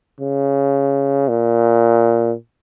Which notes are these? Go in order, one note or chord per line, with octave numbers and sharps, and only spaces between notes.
C#3
A#2